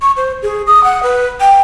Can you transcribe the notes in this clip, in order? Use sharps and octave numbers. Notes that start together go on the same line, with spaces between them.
C#6
C5
G#4
D#6
F#5
B4
G5